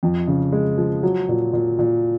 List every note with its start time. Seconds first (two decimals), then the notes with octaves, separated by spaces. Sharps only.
0.03 F2
0.28 C#3
0.52 G#3
0.78 F3
1.03 F#3
1.29 A#2
1.53 A#2
1.79 A#2